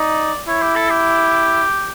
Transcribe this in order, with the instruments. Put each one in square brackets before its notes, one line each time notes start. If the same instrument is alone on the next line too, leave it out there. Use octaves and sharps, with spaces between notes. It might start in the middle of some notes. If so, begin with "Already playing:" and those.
Already playing: [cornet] D#4 [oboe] D5
[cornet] E4 [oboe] C#5
[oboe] G4
A4
G4